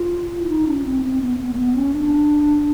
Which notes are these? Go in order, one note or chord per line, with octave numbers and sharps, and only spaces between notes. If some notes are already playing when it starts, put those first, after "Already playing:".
Already playing: F4
E4
D#4
C#4
C4
C4
B3
B3
A#3
B3
C#4
D4